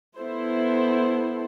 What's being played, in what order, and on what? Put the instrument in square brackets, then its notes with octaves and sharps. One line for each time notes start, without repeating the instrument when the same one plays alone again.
[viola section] B3 E4 A4 C5